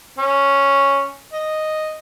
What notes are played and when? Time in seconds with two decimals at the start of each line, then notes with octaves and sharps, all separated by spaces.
0.19 C#4
1.33 D#5